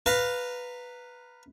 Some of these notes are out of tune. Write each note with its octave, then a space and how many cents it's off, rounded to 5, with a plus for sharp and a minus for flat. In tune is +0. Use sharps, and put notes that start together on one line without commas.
B4 +0 F5 +10 A#5 -15